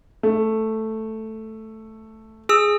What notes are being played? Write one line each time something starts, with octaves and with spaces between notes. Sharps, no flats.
A3
G#4 E6